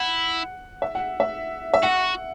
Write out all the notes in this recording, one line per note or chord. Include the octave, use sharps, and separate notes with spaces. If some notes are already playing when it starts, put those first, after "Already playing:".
Already playing: E4 F#5
E5
F#5
E5
E5
F#4 F#5